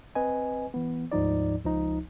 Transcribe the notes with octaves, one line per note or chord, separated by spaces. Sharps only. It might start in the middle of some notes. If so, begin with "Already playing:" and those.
C4 B4 D#5 G#5
E3 B3
D2 G#2 F3 D#4 D5
C#2 F3 D#4